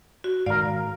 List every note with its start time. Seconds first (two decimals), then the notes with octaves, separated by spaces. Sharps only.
0.24 F#4
0.46 G#2 D#3 A#4 D5 F5